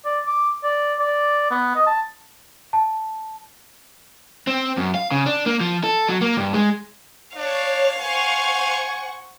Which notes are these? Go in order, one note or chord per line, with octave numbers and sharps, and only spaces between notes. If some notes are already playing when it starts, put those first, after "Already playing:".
D5
D6
D5
D5
B3
D#5
A5
A5
C4
F#2
F5
C#3
D4
A#3
F3
A4
F#3
A#3
G2
G#3
D4 C#5 F5
C5 F#5 G#5 C#6